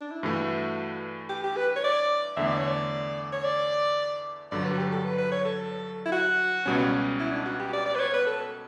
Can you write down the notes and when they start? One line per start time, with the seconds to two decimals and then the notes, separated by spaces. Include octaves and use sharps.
0.01 D4
0.11 E4
0.23 G2 E3 A3 F#4
1.29 G4
1.44 G4
1.57 B4
1.76 C#5
1.84 D5
2.37 E2 D3 A3 E5
2.47 D5
2.57 C#5
2.67 D5
3.32 C#5
3.44 D5
4.51 G2 D3 F#3 D5
4.65 B4
4.72 F#4
4.79 G4
4.92 A4
5.05 B4
5.18 B4
5.32 C#5
5.45 A4
6.06 E4
6.12 F#4
6.66 C#2 B2 G3 C#4
7.20 E4
7.32 D4
7.46 F#4
7.59 G4
7.73 D5
7.86 D5
7.95 B4
7.99 C#5
8.13 B4
8.27 A4